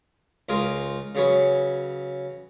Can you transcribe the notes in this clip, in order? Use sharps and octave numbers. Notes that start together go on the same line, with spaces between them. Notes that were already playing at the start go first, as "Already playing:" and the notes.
C#2 F4 G#4 A#4 D#6
C#3 F#3 G#4 B4 C#5